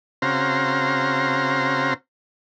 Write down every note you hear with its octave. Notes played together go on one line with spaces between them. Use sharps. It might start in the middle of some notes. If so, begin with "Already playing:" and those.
C#3 C4 F#4 C5 F5 A#5